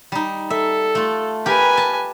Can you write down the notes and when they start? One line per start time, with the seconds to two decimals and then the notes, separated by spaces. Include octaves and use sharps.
0.12 G3 D#4
0.50 A4 E5
0.95 A3 F4
1.46 G4 A#4 B4 G#5
1.77 A5